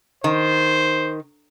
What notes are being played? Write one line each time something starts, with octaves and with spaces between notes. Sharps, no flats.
D#3 C5